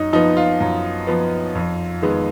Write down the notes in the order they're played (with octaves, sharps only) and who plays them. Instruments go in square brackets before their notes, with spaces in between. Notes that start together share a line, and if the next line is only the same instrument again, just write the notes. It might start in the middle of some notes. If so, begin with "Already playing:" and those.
Already playing: [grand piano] F#2 D#4
F3 B3 D#4
F4
F#2
F3 B3
F2
D#3 G#3 B3